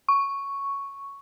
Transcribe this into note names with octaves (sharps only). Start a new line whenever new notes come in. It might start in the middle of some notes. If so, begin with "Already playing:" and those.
C#6